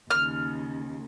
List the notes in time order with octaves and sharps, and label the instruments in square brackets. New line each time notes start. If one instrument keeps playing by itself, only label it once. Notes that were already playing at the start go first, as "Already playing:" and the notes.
[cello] D#2 C#3 [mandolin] F6